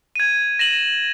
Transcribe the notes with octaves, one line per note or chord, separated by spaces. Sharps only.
G#6 D#7
A#6 E7 F#7